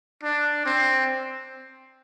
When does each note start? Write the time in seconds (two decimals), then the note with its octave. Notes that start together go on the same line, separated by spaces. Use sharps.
0.23 D4
0.65 C4